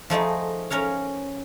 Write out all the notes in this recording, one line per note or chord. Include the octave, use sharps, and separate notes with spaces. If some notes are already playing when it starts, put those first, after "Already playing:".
F3 A3 D#4 G#4
C#4 A#4 C#5 F5